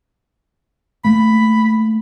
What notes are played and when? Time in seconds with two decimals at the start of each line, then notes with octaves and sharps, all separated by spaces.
1.05 A3 A#3 B5